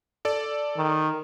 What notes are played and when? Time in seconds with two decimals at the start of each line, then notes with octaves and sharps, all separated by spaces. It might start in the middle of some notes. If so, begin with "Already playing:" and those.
0.25 A4 D5
0.77 D#3